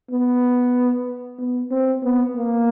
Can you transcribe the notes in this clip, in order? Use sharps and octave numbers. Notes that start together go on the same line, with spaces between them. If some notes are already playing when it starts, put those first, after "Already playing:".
B3
B3
C4
B3
A#3